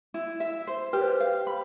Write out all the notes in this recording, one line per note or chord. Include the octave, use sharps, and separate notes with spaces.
E4
E5
C5
G4 B4
C5
B4
F5
B5